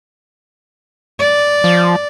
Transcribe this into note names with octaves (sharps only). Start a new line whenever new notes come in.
D5
F3